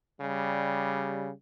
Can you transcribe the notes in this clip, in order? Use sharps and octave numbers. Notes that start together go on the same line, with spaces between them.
C#3 G3